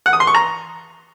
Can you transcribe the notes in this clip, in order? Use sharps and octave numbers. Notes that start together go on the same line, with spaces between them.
F#5
D#6
C6
C#6
A#5